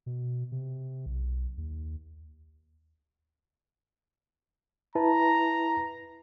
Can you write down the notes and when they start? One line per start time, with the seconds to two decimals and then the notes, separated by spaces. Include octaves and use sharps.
0.06 B2
0.52 C3
1.06 B1
1.58 D#2
4.95 E4 B4 A5 A#5